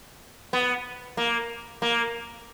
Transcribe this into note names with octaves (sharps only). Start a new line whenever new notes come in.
B3
A#3
A#3